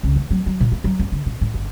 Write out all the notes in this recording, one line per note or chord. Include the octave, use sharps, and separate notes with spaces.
C#2
E3
F#3
F#3
A#2
A#3
F#3
F#2
D3
A#2
A2
G1